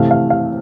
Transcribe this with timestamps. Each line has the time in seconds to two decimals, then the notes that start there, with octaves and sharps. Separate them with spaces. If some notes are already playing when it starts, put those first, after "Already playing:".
Already playing: C3 E3 A3 F5
0.11 F5
0.30 F5